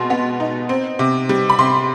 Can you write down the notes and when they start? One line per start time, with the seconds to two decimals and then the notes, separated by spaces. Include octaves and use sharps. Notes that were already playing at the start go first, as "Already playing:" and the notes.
Already playing: B2 G#3 C6
0.10 B3
0.40 D#4
0.69 C4
0.99 C3
1.29 G3
1.50 B5
1.59 C3 C6